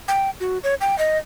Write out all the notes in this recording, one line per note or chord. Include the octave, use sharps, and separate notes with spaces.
G5
F#4
C#5
G5
D#5